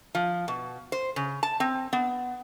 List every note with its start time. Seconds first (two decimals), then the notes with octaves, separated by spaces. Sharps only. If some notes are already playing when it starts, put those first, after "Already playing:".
0.15 F3
0.48 B2
0.92 C5
1.16 C#3
1.43 A5
1.60 C4
1.93 B3